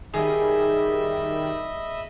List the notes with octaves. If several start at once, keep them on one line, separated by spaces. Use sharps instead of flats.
D#3 G3 G#4 D#5 E5 B5